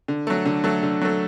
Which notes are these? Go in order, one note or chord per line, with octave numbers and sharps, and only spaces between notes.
D3
F#3 A3
D3
F#3 A3
D3
F#3 A3